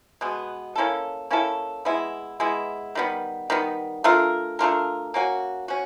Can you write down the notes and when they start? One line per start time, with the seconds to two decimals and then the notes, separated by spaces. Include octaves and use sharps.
0.21 B2 G#3 B3
0.76 A#3 C#4 E4 A4
1.30 A#3 C#4 E4 A4
1.85 G#3 B3 E4
2.40 G#3 B3 E4
2.95 D#3 G3 B3
3.50 D#3 G3 B3
4.04 A3 D4 F4 A#4
4.59 A3 D4 F4 A#4
5.14 A#3 C#4 F#4
5.68 C#4 F#4